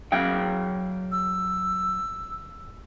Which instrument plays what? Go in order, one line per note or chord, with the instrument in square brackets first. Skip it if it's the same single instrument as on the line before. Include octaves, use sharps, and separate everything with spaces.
[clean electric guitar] F#3 F5 G5
[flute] E6